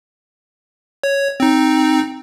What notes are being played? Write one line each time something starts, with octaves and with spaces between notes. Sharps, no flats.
C#5
C4 D#4